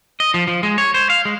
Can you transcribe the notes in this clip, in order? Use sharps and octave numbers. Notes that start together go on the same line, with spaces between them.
D#5
F3
F3
G#3
C#5
C5
F5
G#3